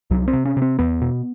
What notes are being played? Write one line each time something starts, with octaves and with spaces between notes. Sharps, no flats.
C2 F#3
C4
C3
C#4
C3
C4
E2 B3
B2